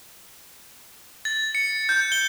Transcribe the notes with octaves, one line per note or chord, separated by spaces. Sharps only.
A6
C#7
G6
G7